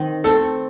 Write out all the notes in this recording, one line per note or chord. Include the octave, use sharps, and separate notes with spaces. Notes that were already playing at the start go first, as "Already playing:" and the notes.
Already playing: D#3 C4
A3 C4 A4